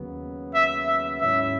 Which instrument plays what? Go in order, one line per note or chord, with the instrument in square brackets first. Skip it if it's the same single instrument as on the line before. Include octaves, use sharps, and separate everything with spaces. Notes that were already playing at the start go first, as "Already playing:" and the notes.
Already playing: [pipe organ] D#2 C#3 F#3 B3
[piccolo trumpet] E5
E5
[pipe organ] G#2 F#3 C#4 E4 [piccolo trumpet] E5